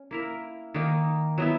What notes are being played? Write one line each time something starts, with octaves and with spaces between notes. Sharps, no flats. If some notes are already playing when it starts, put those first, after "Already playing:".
Already playing: C#4
A#3 E4 A#4
D#3 A#3 D#4
F#3 B3 E4